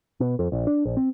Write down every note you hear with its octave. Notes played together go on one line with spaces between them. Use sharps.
B2
F2
A#1
D4
A#1
C4